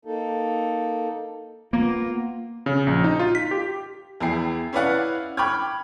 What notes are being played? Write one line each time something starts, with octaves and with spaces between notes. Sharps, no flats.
A#3 D#4 A4
A#3 B3 F4
C#3
A#1
D#4
F4
B6
G4
E2 E4 G#4 G5 C7
C#4 E4 B4 D5 F5 F#5
G5 B5 C#6 D6 F6 G#6